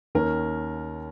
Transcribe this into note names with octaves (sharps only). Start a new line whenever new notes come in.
D#2 D#3 C#4 A#4